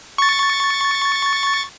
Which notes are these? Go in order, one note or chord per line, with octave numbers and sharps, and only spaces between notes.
C#6 A6